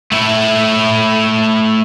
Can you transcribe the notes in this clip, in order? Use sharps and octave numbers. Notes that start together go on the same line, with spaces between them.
A3 E4